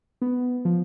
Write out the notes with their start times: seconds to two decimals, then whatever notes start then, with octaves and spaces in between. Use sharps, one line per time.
0.22 B3
0.65 F3